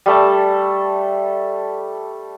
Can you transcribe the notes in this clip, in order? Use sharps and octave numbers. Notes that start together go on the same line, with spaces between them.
G3 A3 A5